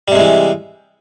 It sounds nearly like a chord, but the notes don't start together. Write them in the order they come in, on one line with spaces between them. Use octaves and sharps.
G3 C3 G#3 E3